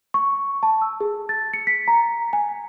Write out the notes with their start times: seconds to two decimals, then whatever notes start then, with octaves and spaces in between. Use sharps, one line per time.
0.14 C#6
0.63 A5
0.82 E6
1.01 G#4
1.29 A6
1.53 C#7
1.67 B6
1.88 A#5
2.33 G#5